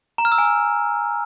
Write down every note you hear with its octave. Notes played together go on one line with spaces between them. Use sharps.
A#5
F6
E6
G#5
E6